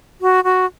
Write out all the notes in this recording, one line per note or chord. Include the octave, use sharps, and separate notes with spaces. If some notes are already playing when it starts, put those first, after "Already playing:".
F#4
F#4